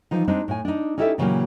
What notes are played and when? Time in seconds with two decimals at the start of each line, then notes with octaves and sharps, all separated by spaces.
0.11 E3 F3 D#4
0.27 G3 G#3 C4 D4 D#4
0.48 A2 G#5
0.65 D4 D#4
0.98 C#4 D#4 E4 G4 A4 E5
1.18 A#2 C#3 E3 F#3 A#3 G4